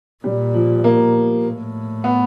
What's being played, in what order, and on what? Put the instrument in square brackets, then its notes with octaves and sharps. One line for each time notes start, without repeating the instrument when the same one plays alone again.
[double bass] A#2 [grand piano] G3
[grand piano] F3
A#3
[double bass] A2
[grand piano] B3